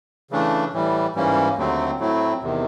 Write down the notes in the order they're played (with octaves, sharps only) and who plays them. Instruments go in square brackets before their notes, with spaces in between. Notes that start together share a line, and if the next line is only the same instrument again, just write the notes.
[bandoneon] C#3 E3 A3 D4
A2 E3 G3
G#2 E3 G3 A#3 C#4
D#2 D3 F#3 A3 C4
A2 F#3 A3 C4 E4
E2 C3 D#3